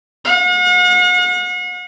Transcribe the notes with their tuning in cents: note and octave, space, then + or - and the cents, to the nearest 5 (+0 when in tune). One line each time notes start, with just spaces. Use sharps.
F#5 -45